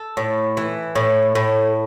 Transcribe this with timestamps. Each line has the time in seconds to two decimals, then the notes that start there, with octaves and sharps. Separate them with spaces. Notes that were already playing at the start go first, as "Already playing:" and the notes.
Already playing: A4
0.17 A2
0.57 E3
0.95 A2
1.35 A2